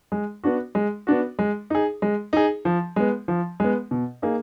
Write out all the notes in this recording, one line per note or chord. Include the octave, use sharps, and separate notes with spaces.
G#3
B3 D4 F#4
G#3
B3 D4 F#4
G#3
D#4 G#4
G#3
D#4 G#4
F3
G#3 B3
F3
G#3 B3
B2
A#3 D#4 G#4